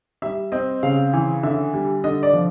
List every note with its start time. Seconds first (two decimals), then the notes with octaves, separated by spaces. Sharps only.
0.22 G3 E5
0.52 C4 D#5
0.83 C#3 F5
1.13 E3
1.43 D3 E5
1.74 G3
2.04 D3 D#5
2.23 D5
2.33 F3